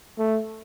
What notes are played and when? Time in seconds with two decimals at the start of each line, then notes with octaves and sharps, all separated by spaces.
0.19 A3